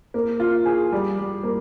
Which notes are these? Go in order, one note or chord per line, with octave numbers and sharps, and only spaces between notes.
A#3
F4
G#4
G3
G3
A#3